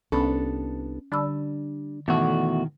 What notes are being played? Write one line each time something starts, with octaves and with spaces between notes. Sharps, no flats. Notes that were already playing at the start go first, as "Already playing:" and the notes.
C2 B3 C#4 D4 A4 B5
D3 G3 D4 B5 E6
E2 G#2 B2 D#3 A3 F#4